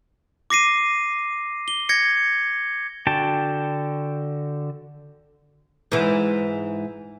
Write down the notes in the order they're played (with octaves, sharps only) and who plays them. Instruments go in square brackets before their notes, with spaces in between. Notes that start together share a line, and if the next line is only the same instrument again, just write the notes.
[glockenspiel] D6 A#6 C7 D#7
G7
G#6 A#6 C#7
[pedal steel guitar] D3 F#4 G5 A5
[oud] G#2 E3